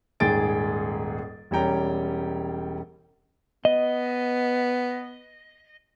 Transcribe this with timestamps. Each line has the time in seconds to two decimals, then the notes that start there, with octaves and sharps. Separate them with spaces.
0.20 D#1 G#2 G#4 G5 A6 D7
1.51 E1 G3 C#4 G5 A#5
3.65 B3 D#5